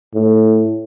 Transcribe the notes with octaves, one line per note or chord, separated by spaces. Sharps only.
A2